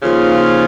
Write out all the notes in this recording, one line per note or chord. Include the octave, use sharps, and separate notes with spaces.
D#2 C#3 F3 F4